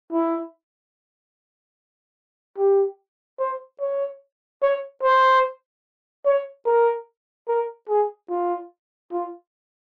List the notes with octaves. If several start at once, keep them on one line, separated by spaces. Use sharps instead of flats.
E4
G4
C5
C#5
C#5
C5
C#5
A#4
A#4
G#4
F4
F4